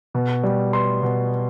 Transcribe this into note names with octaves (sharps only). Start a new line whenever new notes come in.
B2
G3
B3 C6
B2